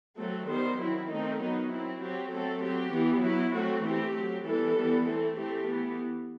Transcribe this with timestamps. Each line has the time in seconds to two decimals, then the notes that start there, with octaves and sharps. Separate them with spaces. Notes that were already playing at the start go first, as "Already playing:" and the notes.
0.18 F#3 A3 C4 A4
0.48 D#3 G3 B3 C5
0.79 D#3 F#3 C4 E4
1.10 D#3 A3 C4 D#4
1.39 D#3 F#3 B3 D#4
1.70 F#3 C4 E4
2.01 F#3 C4 G4
2.31 F#3 A3 C4 A4
2.62 F#3 C4 G4
2.92 E3 B3
3.22 F#3 B3 E4
3.53 F#3 A3 C4 F#4
3.84 E3 A3 C4 G4
4.14 F#3 C4
4.44 E3 G3 B3 A4
4.75 E3 G3 B3
5.05 E3 A3 C4 A4
5.36 E3 A3 C4 G4
5.66 E3 B3